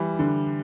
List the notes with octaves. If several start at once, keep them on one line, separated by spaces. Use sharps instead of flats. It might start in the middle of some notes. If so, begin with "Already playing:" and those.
Already playing: E3 G3
D3